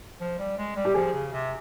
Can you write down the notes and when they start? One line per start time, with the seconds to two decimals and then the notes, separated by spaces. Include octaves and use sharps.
0.20 F3
0.39 G3
0.57 G#3
0.76 G3
0.85 G4
0.94 F3 G#4
1.13 C#3
1.32 C3